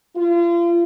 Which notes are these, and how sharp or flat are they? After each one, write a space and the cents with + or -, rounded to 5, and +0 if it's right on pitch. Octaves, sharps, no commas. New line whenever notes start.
F4 -35